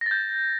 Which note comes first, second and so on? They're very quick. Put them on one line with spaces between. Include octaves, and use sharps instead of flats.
A#6 A6 G6